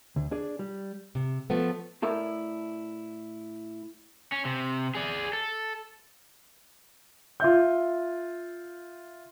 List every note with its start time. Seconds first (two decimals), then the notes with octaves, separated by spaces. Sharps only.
0.16 D2
0.31 D4 G#4 D5
0.59 G3 G4
1.15 C3
1.50 F3 A3 B3
2.02 A2 A3 E4 A4 A#4 D5
4.32 C#4
4.45 C3
4.95 G#4 D5
5.33 A4
7.40 F4 E5 G6